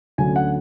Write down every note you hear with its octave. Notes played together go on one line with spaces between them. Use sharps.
D2 D3 F#3 C#4 G#5
F#5